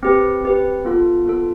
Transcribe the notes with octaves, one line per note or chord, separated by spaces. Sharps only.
C4 G4 B4
C4 G4 B4
B3 F4 A4
B3 F4 A4